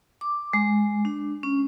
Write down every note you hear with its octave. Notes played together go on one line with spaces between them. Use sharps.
D6
G#3
D4
C#4